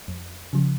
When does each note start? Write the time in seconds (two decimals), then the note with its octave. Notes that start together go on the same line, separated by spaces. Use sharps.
0.08 F2
0.53 C#3 F3